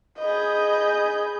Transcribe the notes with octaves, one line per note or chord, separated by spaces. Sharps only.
G#4 D#5 B5 G6